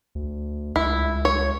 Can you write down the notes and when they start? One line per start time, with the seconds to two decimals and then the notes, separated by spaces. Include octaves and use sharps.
0.15 D2
0.76 C#2 E4
1.25 C#5